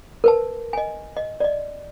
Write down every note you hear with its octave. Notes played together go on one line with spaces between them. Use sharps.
A#4 B4 A5
D#5 G#5
D#5
D5 D#5